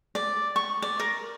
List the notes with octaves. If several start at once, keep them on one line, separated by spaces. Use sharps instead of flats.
D5
C#6
D5
A#4